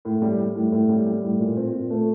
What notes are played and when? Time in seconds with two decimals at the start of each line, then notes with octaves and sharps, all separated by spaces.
0.05 A2
0.22 G3
0.39 G3
0.56 A2
0.72 A2
0.89 G3
1.06 G3
1.23 A2
1.40 A#2
1.57 C4
1.73 A#2
1.90 A3